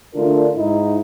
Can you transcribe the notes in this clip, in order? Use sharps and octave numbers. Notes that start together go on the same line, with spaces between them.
D3 A3 D4 F4 A#4
G#2 D#4 E4